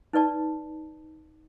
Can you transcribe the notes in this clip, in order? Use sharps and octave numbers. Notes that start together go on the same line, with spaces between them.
D#4 B4 D5 A5